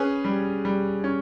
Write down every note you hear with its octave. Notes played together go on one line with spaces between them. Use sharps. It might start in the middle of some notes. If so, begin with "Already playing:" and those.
Already playing: C#4 G#4 B4
G3
G3
C#4